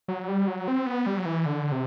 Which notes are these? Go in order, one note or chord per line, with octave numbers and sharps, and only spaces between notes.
F#3
G3
F#3
C4
B3
G3
F#3
E3
D3
C3